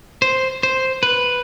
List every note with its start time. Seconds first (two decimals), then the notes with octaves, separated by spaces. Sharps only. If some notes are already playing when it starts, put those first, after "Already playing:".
0.22 C5
0.63 C5
1.03 B4